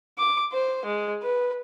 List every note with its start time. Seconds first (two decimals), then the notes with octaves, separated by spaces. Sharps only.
0.18 D6
0.53 C5
0.85 G#3
1.23 B4